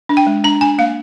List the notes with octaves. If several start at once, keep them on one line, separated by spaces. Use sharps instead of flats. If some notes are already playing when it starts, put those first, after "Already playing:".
D4
G5
G#3
D4 A#5
D4 G#5
A#3 F5